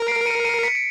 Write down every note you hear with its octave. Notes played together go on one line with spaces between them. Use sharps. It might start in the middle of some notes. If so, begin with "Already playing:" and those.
Already playing: A#4
C7 D7
C#7 D#7
C#7 D#7
B6 C#7
D7